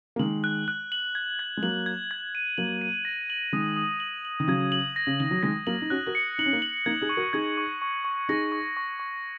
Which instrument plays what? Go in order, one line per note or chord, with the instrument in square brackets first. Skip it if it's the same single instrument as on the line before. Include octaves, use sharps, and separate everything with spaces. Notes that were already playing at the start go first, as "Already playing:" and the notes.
[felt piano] A#3
[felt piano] D#3 G#3 [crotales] F#7
[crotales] F#6
F#6
F#7
G#6
G#6
[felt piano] G#3
[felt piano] F#3 A#3 [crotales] F#7
[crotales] G#6
G#6
D#7
[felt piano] F#3 A#3 [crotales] F#7
[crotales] D#7
A#6
F#7
[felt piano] D#3 G#3 [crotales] D#6
[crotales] D#6
F#7
F#7
[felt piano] D#3
[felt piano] C#3 F#3 [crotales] G#6
[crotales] F#7
A#6
[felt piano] C#3
[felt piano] D#3 [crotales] F#7
[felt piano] F#3
[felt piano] D#3 G#3 [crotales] A#6
[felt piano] F#3 A#3 [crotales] F#7
[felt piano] D#4
[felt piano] C#4 F#4 [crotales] F#6
[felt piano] F#4 A#4
[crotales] C#7
[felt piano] D#4 [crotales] F#7
[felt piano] C#4
A#3 D#4
[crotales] F#7
[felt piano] A#3 D#4 [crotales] G#6
[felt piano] D#4 G#4
[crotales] C#6
[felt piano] F#4 A#4
[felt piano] D#4 G#4 [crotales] G#6
[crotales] C#6
C#6
C#6
[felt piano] D#4 G#4 [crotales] A#6
[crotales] C#6
C#6
C#6